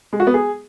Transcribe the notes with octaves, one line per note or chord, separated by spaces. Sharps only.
G#3
F#4
B3
G#4